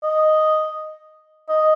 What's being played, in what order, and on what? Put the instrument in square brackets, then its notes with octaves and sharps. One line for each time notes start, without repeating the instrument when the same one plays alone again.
[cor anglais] D#5
D#5